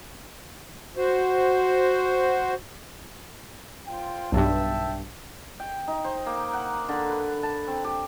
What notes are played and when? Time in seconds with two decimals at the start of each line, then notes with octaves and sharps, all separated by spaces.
0.97 F#4 C5
3.87 F4 C5 G5
4.32 B1 G2 E5 G5 A5
5.60 G5
5.88 D#4
6.04 C5
6.26 A#3
6.53 F#5
6.89 D3
7.09 B4
7.43 A5
7.68 C4
7.84 G4